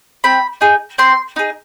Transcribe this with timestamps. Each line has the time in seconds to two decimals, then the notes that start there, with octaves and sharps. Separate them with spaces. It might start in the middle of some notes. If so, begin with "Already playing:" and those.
0.24 C4 B5
0.61 D#4 G#4
0.98 C4 C6
1.36 D#4 G#4